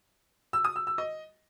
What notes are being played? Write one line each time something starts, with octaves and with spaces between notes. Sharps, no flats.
E6
D#6
E6
E6
D#5